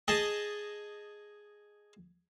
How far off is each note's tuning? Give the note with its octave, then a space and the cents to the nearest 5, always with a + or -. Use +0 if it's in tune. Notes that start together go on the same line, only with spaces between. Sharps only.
G#4 +0 D#5 -5 A5 +0